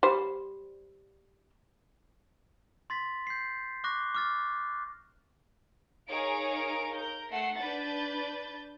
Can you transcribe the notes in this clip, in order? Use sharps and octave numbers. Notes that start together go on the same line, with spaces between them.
G3 C5
C6 A6 B6
G6 C7
C#6 D6 F#6 A#6
D6 F6 A6
D#4 G#4 A#4 C#5 F5 D7
A#4 G6
A3 F#5 E6 C7
D4 B4 G6 A6